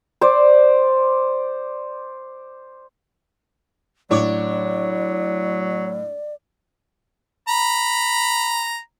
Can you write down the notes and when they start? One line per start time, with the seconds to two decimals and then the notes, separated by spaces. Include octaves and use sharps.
0.21 C5 D5
4.11 A2 F#3 D4 C#5 D5 D6
7.48 A#5 B5